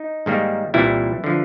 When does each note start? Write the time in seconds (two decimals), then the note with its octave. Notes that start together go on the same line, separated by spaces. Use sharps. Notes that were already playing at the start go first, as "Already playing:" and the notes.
Already playing: D#4
0.26 G#2 D#3 G3 A#3
0.74 C2 A#2 E3 G3 E4
1.24 D3 F3